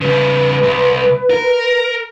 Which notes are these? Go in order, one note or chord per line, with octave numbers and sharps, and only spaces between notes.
C#3 G3 B4
C2
A#4